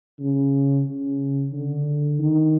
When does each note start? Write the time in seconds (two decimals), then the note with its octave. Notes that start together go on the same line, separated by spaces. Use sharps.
0.20 C#3
0.86 C#3
1.53 D3
2.19 D#3